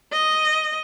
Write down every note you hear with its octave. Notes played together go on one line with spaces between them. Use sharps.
D#5